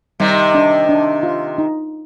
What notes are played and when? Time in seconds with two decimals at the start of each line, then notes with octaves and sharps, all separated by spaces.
0.20 C3 D#3 G3
0.55 D4
0.89 D4
1.23 F4
1.58 D#4